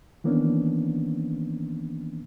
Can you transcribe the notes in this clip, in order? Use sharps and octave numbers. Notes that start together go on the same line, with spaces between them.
D#3 E3 A#3 B3 C#4 D4